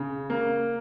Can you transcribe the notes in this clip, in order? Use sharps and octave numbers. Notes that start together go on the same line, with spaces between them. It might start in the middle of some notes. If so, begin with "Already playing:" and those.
Already playing: C#3
A#3